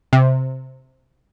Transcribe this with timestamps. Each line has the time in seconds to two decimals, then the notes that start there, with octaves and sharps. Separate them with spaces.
0.13 C3